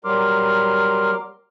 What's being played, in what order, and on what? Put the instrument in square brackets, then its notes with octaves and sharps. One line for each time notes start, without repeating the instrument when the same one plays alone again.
[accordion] F#3 G3 A#4 C6 D6 F6